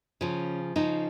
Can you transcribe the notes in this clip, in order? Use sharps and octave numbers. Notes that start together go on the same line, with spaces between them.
C#3 F3 C#4
C#3 F3 D#4